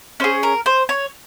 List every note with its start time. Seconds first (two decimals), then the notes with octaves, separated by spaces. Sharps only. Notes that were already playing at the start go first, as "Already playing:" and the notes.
0.20 C#4 G#4 C5
0.43 A#4
0.66 C5
0.89 C#5